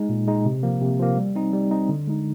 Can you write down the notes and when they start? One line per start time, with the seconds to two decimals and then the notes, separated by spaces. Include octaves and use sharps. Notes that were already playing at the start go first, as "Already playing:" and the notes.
Already playing: G#3 D#4
0.09 A#2
0.27 G#3 D#4
0.45 C3
0.63 F3 A#3
0.81 C3
0.99 F3 A#3
1.17 G3
1.36 C4 D#4
1.53 G3
1.71 C4 D#4
1.89 D3
2.07 G#3 D#4